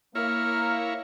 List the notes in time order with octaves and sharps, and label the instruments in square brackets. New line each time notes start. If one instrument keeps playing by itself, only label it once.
[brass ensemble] A#3 [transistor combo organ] E4 A#4 C#5 [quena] F6